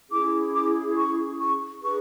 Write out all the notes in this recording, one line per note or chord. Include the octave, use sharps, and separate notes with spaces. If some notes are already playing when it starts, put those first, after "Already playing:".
C#4 E4 G#4 D6
D6
C#6
C#6
D4 G#4 B4 C#6